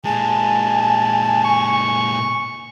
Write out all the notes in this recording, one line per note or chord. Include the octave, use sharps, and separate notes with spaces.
A#2 G#3 G#5 A5
C#6